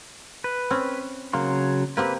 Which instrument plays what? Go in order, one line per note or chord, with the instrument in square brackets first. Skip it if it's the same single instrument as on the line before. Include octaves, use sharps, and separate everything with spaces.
[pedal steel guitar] B4
[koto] C4 C#4
[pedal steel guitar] C#3 F#3 C6 [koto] A#3
[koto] A#3 C4 G4 [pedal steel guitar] B4